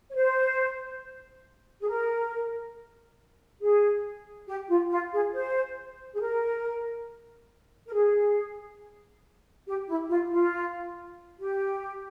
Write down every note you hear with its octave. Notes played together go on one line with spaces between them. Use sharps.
C#5
C5
G#4
A#4
G#4
G4
F4
F4
G#4
C5
G#4
A#4
A#4
G#4
G4
E4
F4
F4
G4